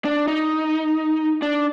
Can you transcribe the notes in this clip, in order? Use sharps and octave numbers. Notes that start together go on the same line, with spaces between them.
D4
D#4
D4